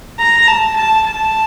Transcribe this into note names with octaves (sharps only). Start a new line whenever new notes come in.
A#5
A5
A5
A5